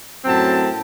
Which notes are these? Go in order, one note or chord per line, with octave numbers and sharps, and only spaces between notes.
F#2 A2 F#3 C4 A5